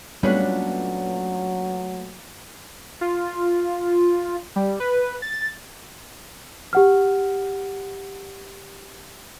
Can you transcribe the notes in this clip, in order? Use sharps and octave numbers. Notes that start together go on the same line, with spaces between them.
A#2 F#3 G3 A3 B3 C#4 D4 B4
F4
G3
B4
A6
G4 F#5 F6